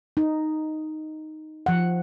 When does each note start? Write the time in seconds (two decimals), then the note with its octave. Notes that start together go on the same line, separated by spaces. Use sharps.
0.17 D#4
1.66 F3 F#5